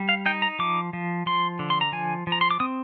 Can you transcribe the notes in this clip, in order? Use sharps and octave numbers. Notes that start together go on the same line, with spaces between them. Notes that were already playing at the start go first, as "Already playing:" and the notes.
Already playing: G3
F5
D#4 G5
A#5
F3 D6
F3
F3 C6
D3
C6
A#5
F3 G#5
F3
A#5
C6
D6
C4 D#6